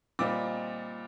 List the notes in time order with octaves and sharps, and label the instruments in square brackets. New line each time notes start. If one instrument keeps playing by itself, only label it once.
[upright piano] A#2 G3 C4 D#4 D6